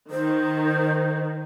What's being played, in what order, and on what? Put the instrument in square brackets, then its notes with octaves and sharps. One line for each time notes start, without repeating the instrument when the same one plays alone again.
[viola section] D#3 [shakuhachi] C5